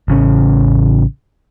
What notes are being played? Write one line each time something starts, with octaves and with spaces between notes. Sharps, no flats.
A1 C#3 C#4